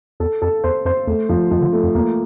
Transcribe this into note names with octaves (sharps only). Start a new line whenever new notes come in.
E2 A4
F2 A4
E2 C5
F2 C5
E2 A3
F2 F3
F2 F3
D3
A3
F2
E2 A#3